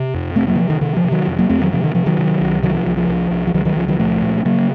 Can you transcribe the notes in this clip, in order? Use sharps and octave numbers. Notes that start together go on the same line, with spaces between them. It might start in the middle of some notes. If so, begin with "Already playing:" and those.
Already playing: C3
F2
C3 A3 C4
F#3 A#3
D#3
C3 F3
D#3
C3 D#3
F3
C3
D#3 F#3
F2
F#3 A#3
F2 A3 C4
D#3 F#3
C3 F3
D#3
C3 F3
D#3 F#3
C3
C2
C3 D#3 F#3
F3
C2 F3
F3
C2
C2
F3
C#2 D#3 F#3
D#3 F#3
C#2 F3
D#3 F#3
A#2 F3 A3
A#2
C#3 F#3 A#3